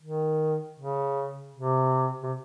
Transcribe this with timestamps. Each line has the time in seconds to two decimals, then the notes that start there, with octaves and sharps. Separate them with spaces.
0.03 D#3
0.80 C#3
1.56 C3
2.23 C3